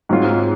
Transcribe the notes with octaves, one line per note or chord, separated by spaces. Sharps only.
G#2 F#3 C4 F4